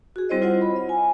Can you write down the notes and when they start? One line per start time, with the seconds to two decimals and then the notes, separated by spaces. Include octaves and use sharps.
0.16 F#4 G#4
0.29 G3 C4 E4 C5 C#5 D#5
0.42 F4 C5 D#5 F#5
0.61 B5
0.76 D#5
0.89 G#5